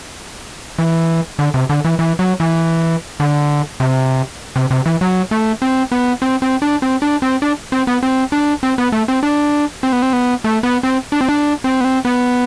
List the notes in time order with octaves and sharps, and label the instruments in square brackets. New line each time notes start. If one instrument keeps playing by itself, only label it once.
[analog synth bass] E3
D3
C3
D3
E3
E3
F#3
E3
D3
C3
C3
C3
E3
F#3
A3
C4
B3
C4
C4
D4
C4
D4
C4
D4
C4
B3
C4
D4
C4
B3
A3
C4
D4
C4
B3
C4
B3
A3
B3
C4
D4
C4
D4
C4
B3
C4
B3